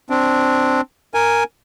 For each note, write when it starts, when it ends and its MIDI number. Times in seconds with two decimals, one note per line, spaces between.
0.10 0.81 60
0.10 0.81 62
1.14 1.44 70
1.14 1.44 80